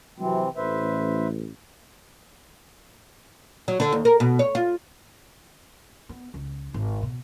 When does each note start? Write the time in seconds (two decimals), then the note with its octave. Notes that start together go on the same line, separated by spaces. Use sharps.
0.18 C3 E3 F#3 C4
0.56 A1 B4 C5 E5
3.68 F#3
3.80 D3
3.92 D#2
4.05 A#4
4.20 B2
4.39 C#5
4.55 F4
6.09 B3
6.34 C#2
6.74 G#1
7.03 B2